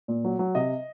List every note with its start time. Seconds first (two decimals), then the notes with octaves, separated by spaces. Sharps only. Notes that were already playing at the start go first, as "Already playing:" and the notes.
0.08 A#2
0.25 F#3
0.39 F#3
0.55 C3 D#5